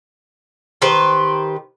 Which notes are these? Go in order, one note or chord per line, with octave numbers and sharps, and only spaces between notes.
D#3 G4 B4 C5